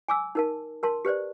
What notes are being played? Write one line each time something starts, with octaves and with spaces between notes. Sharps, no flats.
G#5 D6 E6
D#4 A#4 A5
A#4 A5 C6
G4 B4 C5 D5